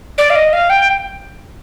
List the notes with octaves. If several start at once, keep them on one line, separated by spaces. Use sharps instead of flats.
D5
F5
D#5
F5
G5